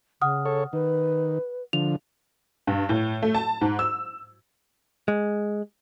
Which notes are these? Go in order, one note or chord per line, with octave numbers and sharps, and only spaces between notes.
C#3 F#5 D#6 F6
A4 C#5
D#3 B4
D3 F3 F7
G2
A2
A3
A5
G#2
E6
G#3